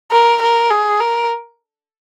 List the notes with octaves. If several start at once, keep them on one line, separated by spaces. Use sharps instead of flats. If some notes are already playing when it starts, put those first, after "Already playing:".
A#4
A#4
G#4
A#4